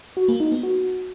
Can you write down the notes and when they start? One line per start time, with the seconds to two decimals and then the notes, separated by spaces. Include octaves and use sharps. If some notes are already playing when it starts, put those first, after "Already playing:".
0.17 F#4
0.28 A#3
0.40 D#4
0.52 B3
0.63 F#4